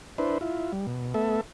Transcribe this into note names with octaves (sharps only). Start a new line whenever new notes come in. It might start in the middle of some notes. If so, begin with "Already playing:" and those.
D4 E4 B4 C5
E4 F4
G3
B2
A3 B3 A4 E5